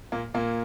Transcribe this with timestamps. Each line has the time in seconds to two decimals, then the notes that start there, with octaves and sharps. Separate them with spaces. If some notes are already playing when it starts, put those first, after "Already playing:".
0.12 A#2 A#3
0.34 A#2 A#3